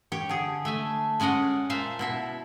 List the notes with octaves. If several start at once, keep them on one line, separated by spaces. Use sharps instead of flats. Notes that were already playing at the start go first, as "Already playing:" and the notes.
G4 C#5 G5
D3 G#4
A3 E5 G#5
G#3 C#4 D5 D#5 F#5
A#2 C5 E5 F5 A5
B2 E4 E5